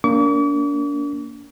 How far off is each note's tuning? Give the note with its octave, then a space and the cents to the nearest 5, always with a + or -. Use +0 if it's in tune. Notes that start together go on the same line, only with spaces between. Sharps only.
A#3 +0 D4 -35 D6 -45